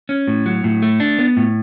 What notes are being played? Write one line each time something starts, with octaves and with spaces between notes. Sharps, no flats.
C#4
A2
F#3
A2
A3
D4
B3
A2